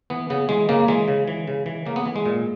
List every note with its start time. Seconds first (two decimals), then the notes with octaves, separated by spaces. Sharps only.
0.10 E3 B3
0.30 C#3 B3
0.49 E3 G#3
0.69 C#3 A#3
0.88 E3 G#3
1.08 C#3
1.28 E3
1.48 C#3
1.66 E3
1.86 C#3 A#3
1.96 B3
2.06 E3
2.16 G#3
2.26 A#2